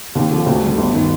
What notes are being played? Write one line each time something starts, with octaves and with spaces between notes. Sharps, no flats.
D#2
D3 F3
D2
D3 G3
G1
D#3